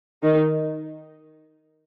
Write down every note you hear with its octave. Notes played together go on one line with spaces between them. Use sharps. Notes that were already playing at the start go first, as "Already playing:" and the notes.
D#3 D#4